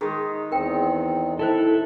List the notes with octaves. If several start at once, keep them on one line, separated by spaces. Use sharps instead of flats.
D#3 G#3 G#4
E2 C4 A#4 G5
E4 A4 A#4 C5